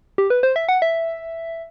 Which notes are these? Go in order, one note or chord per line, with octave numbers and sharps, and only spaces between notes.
G4
B4
C5
E5
F#5
E5